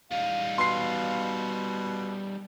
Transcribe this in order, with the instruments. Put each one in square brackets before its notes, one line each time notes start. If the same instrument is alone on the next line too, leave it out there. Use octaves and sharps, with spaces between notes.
[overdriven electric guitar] G3 D#4 [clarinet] F5
[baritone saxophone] B2 [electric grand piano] C6 C7